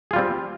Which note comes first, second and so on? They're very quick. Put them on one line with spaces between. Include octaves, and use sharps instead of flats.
G#4 F4 G3 C4